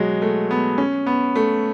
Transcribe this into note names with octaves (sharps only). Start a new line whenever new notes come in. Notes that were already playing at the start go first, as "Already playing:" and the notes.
Already playing: B2 F#3 G#3
A3
B3
C#4
B3
A3